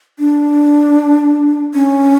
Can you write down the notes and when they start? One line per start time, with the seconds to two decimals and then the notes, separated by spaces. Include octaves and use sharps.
0.19 D4
1.74 C#4